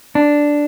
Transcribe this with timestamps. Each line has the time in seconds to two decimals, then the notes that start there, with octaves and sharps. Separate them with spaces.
0.15 D4